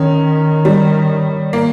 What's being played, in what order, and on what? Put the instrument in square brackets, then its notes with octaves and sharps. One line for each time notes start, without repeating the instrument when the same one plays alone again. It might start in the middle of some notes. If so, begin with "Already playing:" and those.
Already playing: [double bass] D#3 [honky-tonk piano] C#4
[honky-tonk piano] G3
A#3